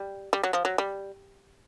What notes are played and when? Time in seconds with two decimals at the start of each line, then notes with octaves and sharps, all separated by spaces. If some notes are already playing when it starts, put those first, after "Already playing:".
Already playing: G3
0.33 G3
0.44 F#3
0.53 F3
0.65 F#3
0.78 G3